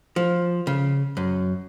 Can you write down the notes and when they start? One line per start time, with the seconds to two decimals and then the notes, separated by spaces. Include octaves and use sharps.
0.16 F3
0.67 C#3
1.17 F#2